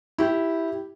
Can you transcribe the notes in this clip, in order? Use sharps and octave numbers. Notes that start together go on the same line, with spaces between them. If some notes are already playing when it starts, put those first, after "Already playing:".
E4 G4